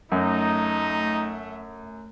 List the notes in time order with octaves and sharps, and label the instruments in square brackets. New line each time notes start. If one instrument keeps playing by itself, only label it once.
[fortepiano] F#2 [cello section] A3 [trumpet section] D#4